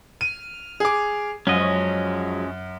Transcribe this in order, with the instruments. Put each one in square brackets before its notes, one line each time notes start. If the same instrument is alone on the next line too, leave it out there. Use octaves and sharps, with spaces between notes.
[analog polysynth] F6 [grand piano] D#7
[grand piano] G#4 D6
[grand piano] F#2 [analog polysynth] F3 F#3 G#3 [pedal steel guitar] C#4 D#5